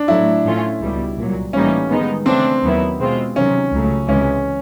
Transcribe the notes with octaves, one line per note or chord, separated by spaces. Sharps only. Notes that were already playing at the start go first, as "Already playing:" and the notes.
Already playing: D4
A2 F#3 A3 E4
A2 F3 A3 C#4 F4
C#2 B2 G3
C2 A#2 F#3
A2 E3 G3 A#3 C#4 D#4
D#3 G#3 B3 D#4
C#3 E3 A3 C4 D4
D#2 D#3 F#3 B3 E4
B2 G#3 C4 F4
C3 D#3 F#3 C#4
C#2 C#3 F#3 A3
C#2 C3 E3 G#3 C#4